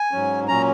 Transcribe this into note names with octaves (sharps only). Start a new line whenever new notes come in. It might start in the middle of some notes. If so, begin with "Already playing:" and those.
Already playing: G#5
G#2 F#3 C#4
A#2 F#3 C#4 A#5